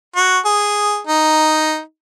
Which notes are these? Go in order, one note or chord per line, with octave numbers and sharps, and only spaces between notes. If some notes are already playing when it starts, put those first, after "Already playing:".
F#4
G#4
D#4